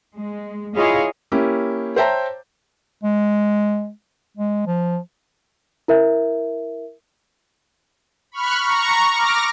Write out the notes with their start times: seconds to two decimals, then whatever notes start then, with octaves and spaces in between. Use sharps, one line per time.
0.17 G#3
0.76 E4 F4 G#4 C#5 D#5 F5
1.32 A#3 C#4 E4 G4
1.96 C5 C#5 E5 G5 A5 A#5
3.03 G#3
4.37 G#3
4.67 F3
5.88 E4 A#4 E5
8.32 B5 C#6 F6 F#6
8.63 A#5 C#6
9.10 D6 F6 A#6